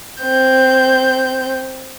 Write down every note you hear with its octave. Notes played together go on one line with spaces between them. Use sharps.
C4 G6